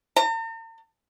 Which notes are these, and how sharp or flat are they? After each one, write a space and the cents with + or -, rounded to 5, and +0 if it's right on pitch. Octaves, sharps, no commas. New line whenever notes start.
A#5 -45